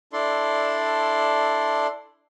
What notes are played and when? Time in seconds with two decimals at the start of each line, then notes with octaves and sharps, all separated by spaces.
0.13 D4 E4 A4 D5 C6